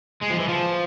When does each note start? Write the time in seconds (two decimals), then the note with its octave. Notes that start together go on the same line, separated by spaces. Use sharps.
0.22 G#3
0.31 F3
0.40 E3
0.49 F3